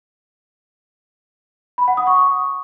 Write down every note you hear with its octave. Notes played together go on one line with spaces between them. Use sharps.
B5
F#5
D#6
C#6